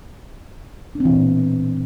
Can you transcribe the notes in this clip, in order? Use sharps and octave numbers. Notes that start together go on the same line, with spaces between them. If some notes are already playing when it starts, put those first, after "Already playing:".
D4
C4
E3
B2
A#2